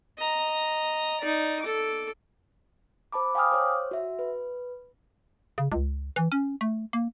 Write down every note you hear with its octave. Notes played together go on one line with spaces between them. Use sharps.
D#5 A#5
D#4 D5
A4 D6
C5 A5 B5 D6
F5 G5 G#5 D6 D#6 F6
C5 C#5
F#4 E5
B4
C#3
C#2
E3
C#4
A3
A#3